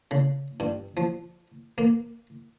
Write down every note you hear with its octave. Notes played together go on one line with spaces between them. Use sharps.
C#3
G2
F3
A#3